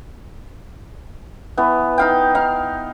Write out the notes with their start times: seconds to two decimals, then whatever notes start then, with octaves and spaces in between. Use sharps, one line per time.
1.57 E3 B3
1.98 D#4 F5 G5
2.35 D#4 F5